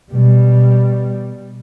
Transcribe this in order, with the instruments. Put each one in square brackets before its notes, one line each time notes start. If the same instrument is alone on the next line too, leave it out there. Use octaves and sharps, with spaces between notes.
[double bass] B2 G3